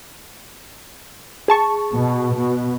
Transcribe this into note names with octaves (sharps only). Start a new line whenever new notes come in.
G#4 A5 C#6
B2
B2